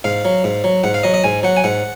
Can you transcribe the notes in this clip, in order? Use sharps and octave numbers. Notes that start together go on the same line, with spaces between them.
G#2 F5
F#3
G#2
F#3
G#2 F#5
F5
F#3 D#5
D#5
G#2 G#5
F#3 F#5
G#5
G#2 F#5